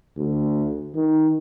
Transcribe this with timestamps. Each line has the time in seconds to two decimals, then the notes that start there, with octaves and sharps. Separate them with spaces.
0.17 D2
0.95 D#3